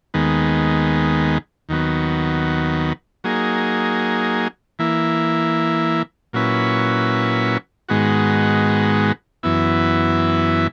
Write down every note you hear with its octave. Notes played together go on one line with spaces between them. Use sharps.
D#2 D#3 G#3 B3
D#2 D#3 F#3 B3
F#3 A#3 D#4 G#4
E3 A#3 E4
A#2 F#3 C#4 E4 B4
G#2 D#3 G#3 B3 F#4
F#2 E3 B3 E4